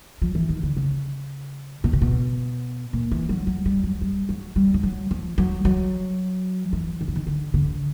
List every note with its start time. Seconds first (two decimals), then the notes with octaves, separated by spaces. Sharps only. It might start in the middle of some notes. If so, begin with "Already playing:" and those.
0.22 F3
0.35 E3
0.49 D#3
0.63 D3
0.76 C#3
1.84 B2
1.93 C3
2.02 B2
2.93 A#2
3.11 E3
3.29 F#3
3.47 F#3
3.66 G3
3.84 F#3
4.01 G3
4.29 F#3
4.56 G3
4.74 F3
4.83 F#3
5.11 F3
5.38 F#3
5.65 F#3
6.73 E3
7.01 D#3
7.08 D3
7.16 D#3
7.27 D3
7.54 D3